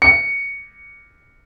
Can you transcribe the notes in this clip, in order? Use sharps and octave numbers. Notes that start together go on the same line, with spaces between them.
C#7